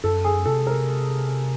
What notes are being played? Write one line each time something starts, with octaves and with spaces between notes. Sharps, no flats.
F#2 A4
G#4
C3 A4
A#4